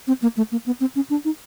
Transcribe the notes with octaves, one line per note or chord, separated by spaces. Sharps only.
C4
A#3
A3
A#3
B3
C4
C#4
D4
D#4